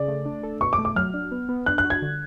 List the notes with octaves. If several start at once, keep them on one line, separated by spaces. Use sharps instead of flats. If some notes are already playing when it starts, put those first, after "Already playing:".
Already playing: C#3 G#4 D5
A3
D4
A4
B2 C#6
D6
A3
D6
F#3 F6
D4
B3
B3
D4 F#6
F#6
F#4
G#6
D3